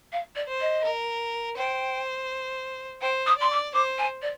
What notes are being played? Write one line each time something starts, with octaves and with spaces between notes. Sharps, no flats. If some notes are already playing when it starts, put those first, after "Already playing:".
F5
D5
C5
D#5
A#4
C5 G5
C5 G5
D#6
D5 C6
D6
C5 D6
G#5
D5